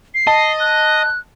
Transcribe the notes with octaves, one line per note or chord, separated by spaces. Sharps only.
C7
D#5 A5
F#6